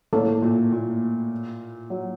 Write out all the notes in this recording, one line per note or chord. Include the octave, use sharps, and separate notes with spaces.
A2 A#3 C#4 A4 C#5
A#2
A#2
F#3